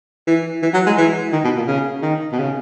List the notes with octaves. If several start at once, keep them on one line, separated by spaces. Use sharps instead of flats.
E3
E3
F#3
G#3
E3
D#3
B2
A#2
C#3
D#3
B2
C#3